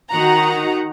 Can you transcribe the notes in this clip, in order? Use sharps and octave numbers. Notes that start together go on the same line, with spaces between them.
D#3 D#4 F#4 F#5 A#5